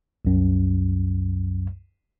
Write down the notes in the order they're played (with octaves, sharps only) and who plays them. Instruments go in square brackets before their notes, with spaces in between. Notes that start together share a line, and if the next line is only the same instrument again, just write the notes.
[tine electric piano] C2 F#2